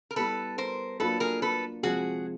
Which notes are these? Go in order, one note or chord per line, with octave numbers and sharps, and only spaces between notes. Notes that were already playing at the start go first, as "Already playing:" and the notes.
A#4
G3 B3 E4 A4 B4
A#4 C5
F#3 A#3 D4 F4 A4 B4
G#4 A#4
A4 B4
C3 F3 G#3 F#4 G#4